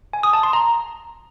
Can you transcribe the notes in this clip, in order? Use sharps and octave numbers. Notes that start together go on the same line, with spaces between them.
G#5
D#6
A5
C6
A#5